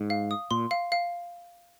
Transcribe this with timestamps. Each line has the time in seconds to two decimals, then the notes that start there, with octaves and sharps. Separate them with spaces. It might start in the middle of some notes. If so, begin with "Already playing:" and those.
Already playing: G#2
0.10 F5
0.31 D#6
0.51 A#2 C6
0.71 F5
0.92 F5